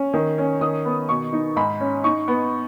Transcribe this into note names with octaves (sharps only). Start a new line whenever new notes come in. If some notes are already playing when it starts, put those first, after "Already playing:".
Already playing: C#4
D#3
C#4
D#3 D#6
B3
B2 C#6
D#4
G#2 B5
C#4
D#4 C#6
B3